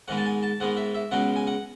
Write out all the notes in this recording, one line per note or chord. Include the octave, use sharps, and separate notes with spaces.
G#2 D#3 G#3 B3 F#5
A5
G#5
A5
G#2 D#3 G#3 B3 F#5
E5
E5
C#2 B2 G#3 B3 F#5
G#5
F#5